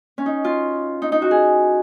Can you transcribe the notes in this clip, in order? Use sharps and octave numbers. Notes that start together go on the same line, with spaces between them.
C#4
D#4
F4
D#4
D#4
F#4
G#4